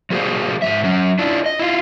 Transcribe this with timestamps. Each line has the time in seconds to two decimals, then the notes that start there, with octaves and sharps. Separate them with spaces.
0.10 F3 G3 A#3 F#4 G#4 C5
0.62 G#2 E3 E5
0.84 F#3 C#4
1.19 D4 E4 F4
1.46 D#5
1.59 E4 F4